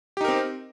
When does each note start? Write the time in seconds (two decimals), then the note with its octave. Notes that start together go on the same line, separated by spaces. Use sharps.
0.17 G4
0.21 D#4
0.24 A#4
0.28 C4